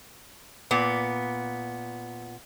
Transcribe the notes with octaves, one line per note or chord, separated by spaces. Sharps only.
A#2 B3